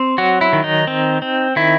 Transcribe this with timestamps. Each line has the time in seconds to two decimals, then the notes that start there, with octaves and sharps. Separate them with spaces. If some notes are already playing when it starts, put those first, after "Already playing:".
Already playing: C4
0.18 F#3 F#4
0.41 E4
0.53 D#3
0.64 D#4
0.87 C4
1.22 C4
1.56 D#3 E4